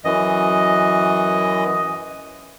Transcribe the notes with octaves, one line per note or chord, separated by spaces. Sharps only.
F#2 E3 D#5